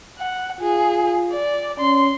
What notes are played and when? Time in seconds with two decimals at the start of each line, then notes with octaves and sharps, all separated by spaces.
0.18 F#5
0.61 F4 G#4
1.32 D5
1.79 C#4 C6